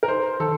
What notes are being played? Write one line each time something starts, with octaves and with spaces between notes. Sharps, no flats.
A#4
D#4 C5
D#3 A4